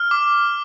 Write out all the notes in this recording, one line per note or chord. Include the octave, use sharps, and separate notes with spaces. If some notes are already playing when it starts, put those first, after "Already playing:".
Already playing: F6
D6